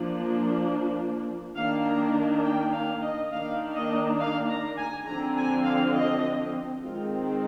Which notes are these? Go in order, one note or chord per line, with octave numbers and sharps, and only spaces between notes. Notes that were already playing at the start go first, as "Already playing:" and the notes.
Already playing: F3 A#3 D4
D#3 A#3 D4 F5
A#5
G5
F5
D#5
D#3 A#3 D4 F5
D#5
F5
A#5
G#5
D3 F3 C4 A#5
G#5
F5
D#5
D#3 G#3 C4 F4